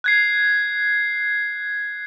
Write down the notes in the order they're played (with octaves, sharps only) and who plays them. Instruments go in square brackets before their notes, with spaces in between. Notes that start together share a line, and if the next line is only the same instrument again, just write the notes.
[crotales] F#6 G#6 C7